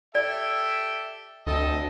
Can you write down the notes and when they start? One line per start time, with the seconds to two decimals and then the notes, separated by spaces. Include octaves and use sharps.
0.15 G4 A4 D5 E5
1.47 D2 C4 A4 D#5